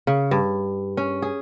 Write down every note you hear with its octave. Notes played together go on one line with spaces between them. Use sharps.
C#3
G2
C#4
G#4